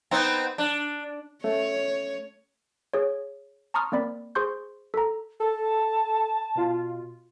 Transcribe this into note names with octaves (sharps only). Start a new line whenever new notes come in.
B3 C4 D#4
D4
A3 C#4 C#5
G#4 C#5
A5 A#5 C6 C#6 D#6 F6
A#3 C4 D5 B5
G#4 C5 C6 C#6 G6
A4 A#5
A4 A5
B2 F4